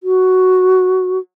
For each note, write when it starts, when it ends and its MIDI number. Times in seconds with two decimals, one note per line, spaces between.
0.03 1.18 66